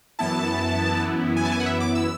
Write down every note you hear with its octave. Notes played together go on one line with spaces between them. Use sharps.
F#2 E3 B3 E4 A5
G#5
A5
G#5
F#5
E5
D6
E6